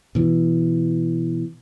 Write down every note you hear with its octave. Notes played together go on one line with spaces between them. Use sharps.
B2 E3